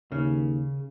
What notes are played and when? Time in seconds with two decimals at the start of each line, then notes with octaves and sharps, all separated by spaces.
0.12 D#2 C#3